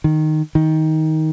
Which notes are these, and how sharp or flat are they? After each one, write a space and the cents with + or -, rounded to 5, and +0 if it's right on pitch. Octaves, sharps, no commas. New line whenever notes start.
D#3 -5
D#3 +15